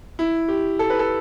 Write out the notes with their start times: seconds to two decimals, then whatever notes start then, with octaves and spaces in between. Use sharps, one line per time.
0.19 E4
0.48 G4
0.79 A4
0.90 B4
0.99 A4